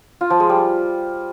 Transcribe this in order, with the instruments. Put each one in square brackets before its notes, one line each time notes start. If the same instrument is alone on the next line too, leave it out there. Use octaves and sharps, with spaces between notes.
[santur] F4
F3
G#3
G3